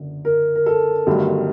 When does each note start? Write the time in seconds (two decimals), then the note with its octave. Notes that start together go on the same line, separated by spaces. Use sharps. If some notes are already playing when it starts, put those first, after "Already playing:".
Already playing: F#1 F#2 D3
0.25 A#4
0.56 A#4
0.66 A4
1.06 G1 G2 D#3 F#3 A3